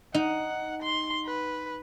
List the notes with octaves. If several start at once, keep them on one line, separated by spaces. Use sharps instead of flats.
D#4 F#5
C6
B4